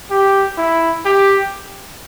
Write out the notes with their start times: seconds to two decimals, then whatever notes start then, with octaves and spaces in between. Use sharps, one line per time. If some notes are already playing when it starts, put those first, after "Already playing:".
0.10 G4
0.58 E4
1.05 G4